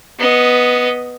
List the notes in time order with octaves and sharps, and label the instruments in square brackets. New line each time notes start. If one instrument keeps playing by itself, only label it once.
[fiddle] B3 D#5